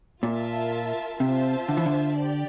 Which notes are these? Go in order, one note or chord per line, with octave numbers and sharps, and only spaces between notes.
A#2 F4 A#4 E5 A5
C3 F4 C5 E5 A5
D3
E3
D3
G4 D5